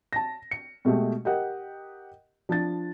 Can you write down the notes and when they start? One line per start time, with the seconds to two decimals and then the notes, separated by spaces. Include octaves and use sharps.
0.13 A5 A#6
0.51 C#7
0.85 B2 G#3 A3 G4
1.25 G4 A#4 D#5 F#5
2.49 F3 D4 A6